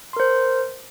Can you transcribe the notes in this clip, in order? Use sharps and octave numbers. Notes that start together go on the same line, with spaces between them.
A#4 C5 C6